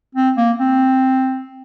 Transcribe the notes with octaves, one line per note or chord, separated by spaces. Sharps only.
C4
A#3
C4